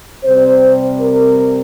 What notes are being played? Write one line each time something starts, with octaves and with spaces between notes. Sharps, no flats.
C3 G3 C4 C5
A#4